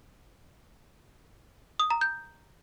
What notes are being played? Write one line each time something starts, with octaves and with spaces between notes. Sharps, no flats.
D#6
A#5
G6